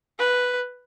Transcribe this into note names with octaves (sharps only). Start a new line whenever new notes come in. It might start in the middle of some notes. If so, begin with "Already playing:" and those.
B4